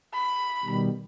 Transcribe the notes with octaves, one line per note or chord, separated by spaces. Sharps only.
B5
B2 D#3 G3